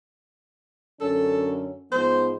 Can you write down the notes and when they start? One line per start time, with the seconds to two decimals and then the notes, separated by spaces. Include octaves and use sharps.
1.00 F#2 D3 C#4 A4
1.92 G#2 F3 B3 C5